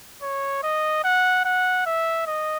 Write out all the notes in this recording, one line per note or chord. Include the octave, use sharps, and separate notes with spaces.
C#5
D#5
F#5
F#5
E5
D#5